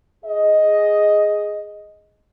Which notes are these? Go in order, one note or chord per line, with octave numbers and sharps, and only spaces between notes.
G#4 D#5